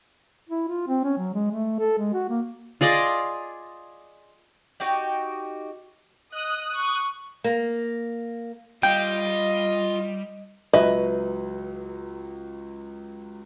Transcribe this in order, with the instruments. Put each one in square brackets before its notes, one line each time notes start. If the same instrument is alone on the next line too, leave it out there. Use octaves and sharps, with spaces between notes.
[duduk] E4
F4
C4
C#4
F#3
G#3
A3
A4
G#3
F#4
A#3
[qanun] F4 G#4 D5 D#5
[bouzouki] D#4 F#4 G4 D5
[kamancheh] D#5 [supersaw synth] D#6 F#6
[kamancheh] C#6
[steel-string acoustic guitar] A#3
[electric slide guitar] G3 [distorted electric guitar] F4 [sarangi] D#5 [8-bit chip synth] G5
[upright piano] C#2 F#3 F#7 [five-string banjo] B4 D#5 E5